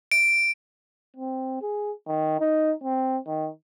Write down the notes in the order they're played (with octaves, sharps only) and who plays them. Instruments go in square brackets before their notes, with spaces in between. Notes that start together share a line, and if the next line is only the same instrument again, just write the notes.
[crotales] D7
[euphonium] C4
G#4
D#3
D#4
C4
D#3